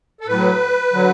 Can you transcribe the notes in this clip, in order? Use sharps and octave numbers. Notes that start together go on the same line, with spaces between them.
A4
A2 F#3 B4
D3 F#3